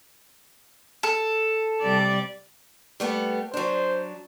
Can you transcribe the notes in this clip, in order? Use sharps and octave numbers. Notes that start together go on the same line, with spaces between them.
A4
C3 G3 D5
G3 A3 B3
F#3 D4 C5